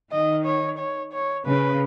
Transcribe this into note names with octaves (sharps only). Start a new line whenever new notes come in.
D#3 D#5
C#5
C#5
C#5
C#3 B4